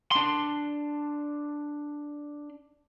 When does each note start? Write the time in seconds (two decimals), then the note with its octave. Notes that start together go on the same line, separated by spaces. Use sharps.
0.12 D4 C6